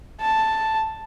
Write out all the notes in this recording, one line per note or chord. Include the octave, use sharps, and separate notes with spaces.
A5